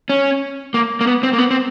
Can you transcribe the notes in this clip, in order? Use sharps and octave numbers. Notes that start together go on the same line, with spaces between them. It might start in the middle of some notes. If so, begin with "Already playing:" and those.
C#4
A#3
A#3
B3
C4
A#3
B3
C4